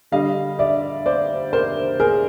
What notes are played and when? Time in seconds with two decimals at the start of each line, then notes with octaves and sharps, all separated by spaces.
0.12 D3 G3 D#5 F5
0.59 D5 E5
1.06 C5 D5
1.53 A#4 C5
2.00 G#4 A#4